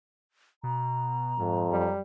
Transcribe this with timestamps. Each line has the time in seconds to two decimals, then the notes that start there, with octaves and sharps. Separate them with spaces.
0.63 B2 A#5
1.39 F2 G#2
1.71 F#2 G3